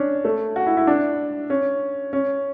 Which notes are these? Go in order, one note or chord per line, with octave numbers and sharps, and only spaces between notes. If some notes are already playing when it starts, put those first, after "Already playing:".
Already playing: C#4 D4
A3
F#4
E4
E4
D4
C#4
C#4